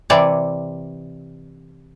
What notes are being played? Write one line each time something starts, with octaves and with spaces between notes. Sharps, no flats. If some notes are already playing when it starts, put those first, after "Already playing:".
C3 E3 C#5 D5